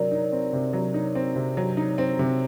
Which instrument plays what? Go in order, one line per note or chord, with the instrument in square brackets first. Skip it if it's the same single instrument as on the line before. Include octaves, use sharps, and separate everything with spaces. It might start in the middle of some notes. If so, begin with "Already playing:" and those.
Already playing: [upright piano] C3 F#3 C4 [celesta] A#4 D5
[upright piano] D#4
C4
C3
F#3
D#4
C4
C3
F#3
D#4
C4
C3